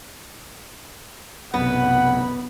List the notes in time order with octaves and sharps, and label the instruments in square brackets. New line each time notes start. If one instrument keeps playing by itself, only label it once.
[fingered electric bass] B1 F#2 C3 [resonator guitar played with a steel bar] B3 [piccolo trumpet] F#5 [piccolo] B5